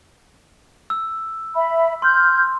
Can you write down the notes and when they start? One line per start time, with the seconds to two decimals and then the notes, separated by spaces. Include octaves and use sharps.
0.90 E6
1.55 E5 B5
2.02 C6 F6 G6